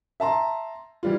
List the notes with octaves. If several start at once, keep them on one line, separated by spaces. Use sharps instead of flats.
E5 A5 A#5 C6
E3 G3 F4